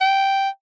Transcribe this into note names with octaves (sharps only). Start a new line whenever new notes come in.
G5